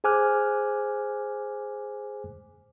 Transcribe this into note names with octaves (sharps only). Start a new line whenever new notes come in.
G#4 C5 G#5 D6 F6 F#6